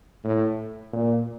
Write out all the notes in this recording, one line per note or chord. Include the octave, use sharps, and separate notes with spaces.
A2
A#2